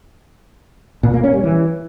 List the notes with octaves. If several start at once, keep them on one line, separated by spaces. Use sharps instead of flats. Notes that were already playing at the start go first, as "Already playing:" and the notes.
A#2
A#3
C#4
G3
E3